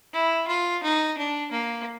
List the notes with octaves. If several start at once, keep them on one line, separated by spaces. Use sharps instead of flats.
E4
F4
D#4
D4
A#3